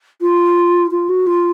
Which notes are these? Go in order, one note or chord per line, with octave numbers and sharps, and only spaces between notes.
F4
F4
F#4
F4